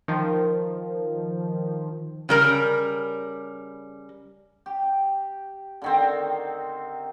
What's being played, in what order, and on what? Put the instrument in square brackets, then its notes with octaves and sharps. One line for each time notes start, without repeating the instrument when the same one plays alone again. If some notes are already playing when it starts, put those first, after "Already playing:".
[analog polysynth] D#3 F3
[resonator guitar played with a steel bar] C#3 G3 A#4
[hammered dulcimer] G4
D3 D#3 C4